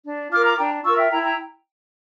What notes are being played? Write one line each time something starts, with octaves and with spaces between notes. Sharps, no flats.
D4
F4 A#4 D6 F6
A#5 D6
D4 G5 A#5
F4 A#4 C#6 E6
E5 G5
E4 G5 A#5
G5 A#5